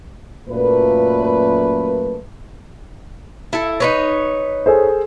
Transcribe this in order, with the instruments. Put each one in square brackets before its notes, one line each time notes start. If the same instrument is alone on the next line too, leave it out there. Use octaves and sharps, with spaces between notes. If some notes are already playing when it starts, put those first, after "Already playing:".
[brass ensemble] F#2 A#2 A3 B4
[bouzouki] E4 A4
D#4 B4 C#5
[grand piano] G#4 A4 C5